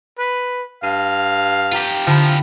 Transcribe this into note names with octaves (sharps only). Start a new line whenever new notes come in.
B4
G2 F5 D#7
F4 G4 G5 A#5 D#7
D3 F3 E4 B5